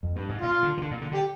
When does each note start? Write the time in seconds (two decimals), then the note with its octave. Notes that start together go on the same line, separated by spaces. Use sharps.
0.03 F2
0.16 G2
0.29 G#2
0.42 A#2 F4
0.63 D3
0.77 D#3
0.82 D3
0.91 A#2
1.01 D3
1.11 D3
1.14 G4